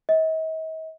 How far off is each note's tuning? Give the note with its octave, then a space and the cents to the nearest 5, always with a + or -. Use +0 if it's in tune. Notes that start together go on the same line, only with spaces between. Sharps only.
D#5 +45